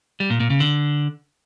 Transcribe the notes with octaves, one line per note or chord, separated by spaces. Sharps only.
G3
A#2
A#2
C#3
D3